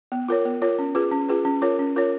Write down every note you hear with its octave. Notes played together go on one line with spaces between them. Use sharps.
B3
F4 A#4 C#5
B3
F4 A#4 C#5
C#4
F4 G#4 B4
C#4
F4 G#4 B4
C#4
F4 A#4 C#5
C#4
F4 A#4 C#5